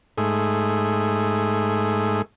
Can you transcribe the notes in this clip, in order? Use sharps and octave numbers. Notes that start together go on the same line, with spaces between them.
G#2 A3 G#4